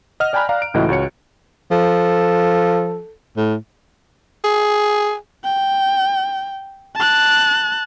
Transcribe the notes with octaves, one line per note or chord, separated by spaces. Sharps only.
D#5 F#5 F6
D5 G5 G#5 A#5 B5 F#6
D5 F5 A#5
D7
C#2 A2 E3 F#4 D#5
C#2 F#4 C#5 C#7
F3 A4
A2
G#4
G5
A5 F#6